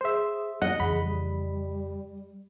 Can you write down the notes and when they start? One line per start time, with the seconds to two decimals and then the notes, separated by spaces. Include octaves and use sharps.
0.01 G#4 C5 E5
0.62 D#5 F#5
0.80 F2 C#3 E3 G#4 B5
1.04 G3